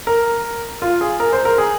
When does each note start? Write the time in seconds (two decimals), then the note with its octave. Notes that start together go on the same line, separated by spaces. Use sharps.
0.07 A#4
0.82 F4
1.01 G#4
1.20 A#4
1.33 C5
1.45 A#4
1.58 G#4